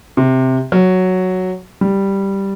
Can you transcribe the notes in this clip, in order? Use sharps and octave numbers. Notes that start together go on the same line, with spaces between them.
C3
F#3
G3